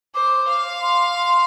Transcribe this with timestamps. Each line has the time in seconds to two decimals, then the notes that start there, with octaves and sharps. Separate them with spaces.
0.15 C5 D6
0.48 F5
0.82 C6